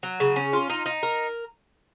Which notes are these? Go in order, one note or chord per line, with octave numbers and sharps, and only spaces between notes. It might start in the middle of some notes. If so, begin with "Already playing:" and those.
F#3
C#3
C#4
F4
D#4
D#4
A#4